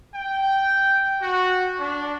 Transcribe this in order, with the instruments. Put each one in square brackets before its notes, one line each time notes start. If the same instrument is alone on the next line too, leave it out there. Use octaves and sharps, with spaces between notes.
[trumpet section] G5
F#4
D4